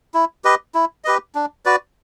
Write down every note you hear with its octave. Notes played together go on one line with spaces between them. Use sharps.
E4
G4 B4 D#5
E4
G4 B4 D#5
D4
F#4 B4 D5